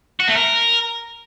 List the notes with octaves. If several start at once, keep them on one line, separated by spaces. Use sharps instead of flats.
F#4
A3
A#4